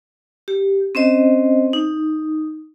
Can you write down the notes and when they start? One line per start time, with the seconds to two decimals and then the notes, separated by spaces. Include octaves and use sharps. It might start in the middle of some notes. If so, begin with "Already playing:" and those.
0.48 G4
0.95 C4 C#4 C5 D#5
1.73 D#4